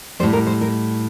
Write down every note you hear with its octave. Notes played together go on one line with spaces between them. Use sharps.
A2 G3 C5
A#4
C5
A#4